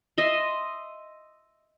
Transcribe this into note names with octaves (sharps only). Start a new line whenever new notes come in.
D#5 E5 C6